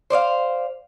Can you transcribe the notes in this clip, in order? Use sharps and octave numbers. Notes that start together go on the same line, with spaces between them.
C5 D5 D#5 F5